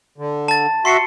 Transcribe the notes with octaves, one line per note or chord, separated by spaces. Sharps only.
D3
A5 A6
F#4 E5 C6 C7 C#7